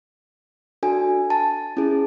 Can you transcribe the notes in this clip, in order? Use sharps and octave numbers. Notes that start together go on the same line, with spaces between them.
D4 F#4 A4 G#5
A5
C#4 E4 G#4